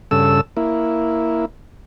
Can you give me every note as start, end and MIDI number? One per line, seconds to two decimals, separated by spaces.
0.11 0.41 43
0.11 0.41 49
0.11 0.41 69
0.11 0.41 88
0.57 1.45 58
0.57 1.45 64